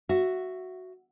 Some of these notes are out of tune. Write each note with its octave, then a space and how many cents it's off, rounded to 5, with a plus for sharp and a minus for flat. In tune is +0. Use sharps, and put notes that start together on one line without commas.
F#4 +0 E5 +15